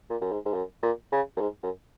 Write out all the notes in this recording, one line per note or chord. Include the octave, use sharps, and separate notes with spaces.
A#2
F#2
G#2
G#2
F#2
A#2
C#3
F#2
G#2
F#2